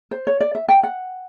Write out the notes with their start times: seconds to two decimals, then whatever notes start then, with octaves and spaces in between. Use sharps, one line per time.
0.11 C5
0.27 C#5
0.40 D5
0.55 E5
0.68 G5
0.83 F#5